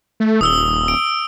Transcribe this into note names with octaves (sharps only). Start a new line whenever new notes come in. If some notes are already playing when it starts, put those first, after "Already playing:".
A3
D#1 D#6 E6 G7
D7